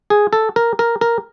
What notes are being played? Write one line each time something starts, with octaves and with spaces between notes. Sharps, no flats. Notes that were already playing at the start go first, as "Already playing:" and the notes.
G#4
A4
A#4
A#4
A#4